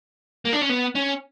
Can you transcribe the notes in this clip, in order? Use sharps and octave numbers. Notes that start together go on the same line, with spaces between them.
A#3
D4
C#4
B3
C#4